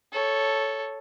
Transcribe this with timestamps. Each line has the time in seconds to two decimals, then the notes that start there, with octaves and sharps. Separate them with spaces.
0.12 A4 C#5